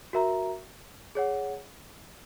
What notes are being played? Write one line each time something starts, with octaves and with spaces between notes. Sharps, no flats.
F#4 A#4 E5 A#5
G#4 C#5 F#5